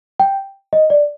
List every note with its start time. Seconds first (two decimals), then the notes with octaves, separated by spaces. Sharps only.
0.20 G5
0.73 D#5
0.90 D5